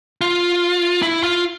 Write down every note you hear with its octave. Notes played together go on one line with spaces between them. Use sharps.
F4
E4
F4